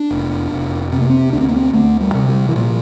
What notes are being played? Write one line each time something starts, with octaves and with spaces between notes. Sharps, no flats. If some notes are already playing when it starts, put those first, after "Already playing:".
Already playing: D4
F1
F1
C3 C4
A#3
C4
D2 D4
C4
A#3
C4
D2 A3
G3
C3
G3
E3
A#2 F3